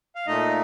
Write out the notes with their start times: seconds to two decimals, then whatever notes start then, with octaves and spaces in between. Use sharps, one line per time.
0.16 F5
0.27 A#2 A3 D#4 D#5